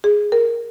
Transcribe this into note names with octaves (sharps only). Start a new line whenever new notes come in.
G#4
A#4